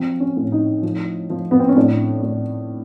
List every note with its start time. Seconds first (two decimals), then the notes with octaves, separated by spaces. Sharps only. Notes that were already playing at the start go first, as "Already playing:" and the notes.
Already playing: F3 F#3 C4
0.20 C#4
0.37 A2
0.52 D#4
0.83 F3
1.30 F3
1.51 B3
1.60 C4
1.69 C#4
1.76 A2 D4
2.23 A2